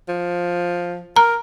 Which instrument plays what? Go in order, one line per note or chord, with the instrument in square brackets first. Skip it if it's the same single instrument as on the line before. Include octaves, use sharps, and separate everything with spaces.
[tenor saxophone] F3
[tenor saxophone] A#4 [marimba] A#5